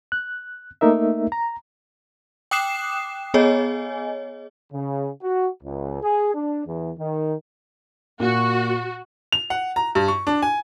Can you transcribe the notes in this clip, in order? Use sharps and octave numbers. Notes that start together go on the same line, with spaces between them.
F#6
A3 A#3 D#4 A#4 E5
A#5
G5 D6 D#6 F#6 C7 E7
B3 G#4 C#5 D#5 G#5
C#3
F#4
C#2
G#4
D4
E2
D#3
A#2 F#4
F7
F#5
A#5
G2
C#6
D4
G#5